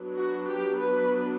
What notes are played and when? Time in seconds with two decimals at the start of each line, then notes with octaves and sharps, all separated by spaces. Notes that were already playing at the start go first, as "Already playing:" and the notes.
Already playing: F#3 B3 D4
0.15 F#4
0.47 G4
0.79 B4